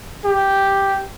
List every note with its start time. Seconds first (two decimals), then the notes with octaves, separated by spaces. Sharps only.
0.25 G4